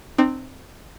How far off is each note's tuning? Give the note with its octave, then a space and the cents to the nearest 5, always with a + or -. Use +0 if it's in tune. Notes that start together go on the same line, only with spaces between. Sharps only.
C4 +0 D#4 -40